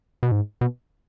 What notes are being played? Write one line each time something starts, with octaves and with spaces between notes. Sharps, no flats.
B2
G#2
B2